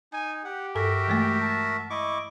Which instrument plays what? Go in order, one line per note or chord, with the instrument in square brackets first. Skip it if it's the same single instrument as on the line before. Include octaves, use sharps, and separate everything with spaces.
[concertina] D#4 [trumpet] G#5
[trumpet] G4 [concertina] F#5
[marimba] G2 A4 [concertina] F#4 A#4 E5
[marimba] E3 G#3 A3
[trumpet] A5
[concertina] E4 C#6 D6 [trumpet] D#5